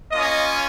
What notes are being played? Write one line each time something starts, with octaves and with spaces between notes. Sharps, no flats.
A#3 C#4 F4 D#5